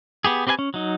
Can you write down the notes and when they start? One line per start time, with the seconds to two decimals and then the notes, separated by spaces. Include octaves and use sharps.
0.24 B3 G4 G#4
0.47 C4 G4 B4 E5 G#5
0.59 C#4
0.74 F#3 D#4